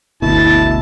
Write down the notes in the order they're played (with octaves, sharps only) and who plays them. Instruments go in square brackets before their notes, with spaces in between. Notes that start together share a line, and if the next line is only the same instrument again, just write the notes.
[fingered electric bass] G1 D2 B2 [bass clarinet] E4 [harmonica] A5